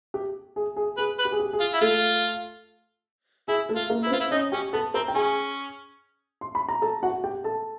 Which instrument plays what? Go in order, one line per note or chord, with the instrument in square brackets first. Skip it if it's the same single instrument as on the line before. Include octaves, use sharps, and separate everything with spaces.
[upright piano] G4
G#4
G#4
[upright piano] G#4 [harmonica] B4
[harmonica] B4
[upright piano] G4
G#4
G4
G#4
[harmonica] F4
E4
[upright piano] A3 A4 [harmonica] F4
[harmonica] E4 [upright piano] G#4
[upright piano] A3 A4
[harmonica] F4
[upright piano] A#3 A#4
[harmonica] E4
[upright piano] B4
[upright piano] C4 C5 [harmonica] F4
[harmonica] E4
[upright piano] C#4 C#5 [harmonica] D#4
[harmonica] C#4 [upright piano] G4 G5
[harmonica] B3 [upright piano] A4 A5
[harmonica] C4 [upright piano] A#4 A#5
[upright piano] G5
[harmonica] C#4 [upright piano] G#4 G#5
[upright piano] C6
B5
A#5
A4 A5
F#4 F#5
G4 G5
A4 A5